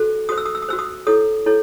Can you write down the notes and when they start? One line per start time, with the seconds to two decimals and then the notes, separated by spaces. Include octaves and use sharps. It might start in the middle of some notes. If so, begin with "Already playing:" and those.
Already playing: F#4 A4 C5
0.29 F#4 C5 D#6
0.37 E6
0.46 D#6
0.55 E6
0.62 D#6
0.68 F#4 C5 E6
0.79 D#6
1.07 E4 A4 C#5 D#6
1.46 E4 A4 C#5